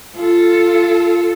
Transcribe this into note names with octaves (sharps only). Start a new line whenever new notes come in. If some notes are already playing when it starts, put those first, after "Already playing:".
F4 A4